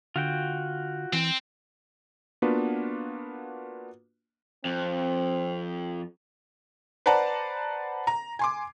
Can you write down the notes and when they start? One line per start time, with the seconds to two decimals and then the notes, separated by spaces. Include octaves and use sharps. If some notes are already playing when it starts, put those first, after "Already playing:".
0.16 D3 F4 F#4 G5
1.13 E3 C4
2.42 A#3 B3 D4 F4 F#4 B4
4.65 F2 C4
7.06 B4 C5 D5 F#5 A5 A#5
8.07 A#5
8.39 G#5 C6 D6